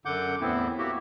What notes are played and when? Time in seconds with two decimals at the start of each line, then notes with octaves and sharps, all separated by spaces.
0.05 F#2 D3 F#5 D6 G6
0.41 E2 A2 B3 C4 E4
0.78 A#3 E4 F#4 G4